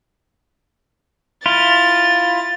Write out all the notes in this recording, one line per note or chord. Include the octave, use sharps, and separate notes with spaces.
E4 F4 A6